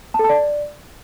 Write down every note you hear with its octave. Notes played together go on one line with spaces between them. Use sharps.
A5
A4
A5
D5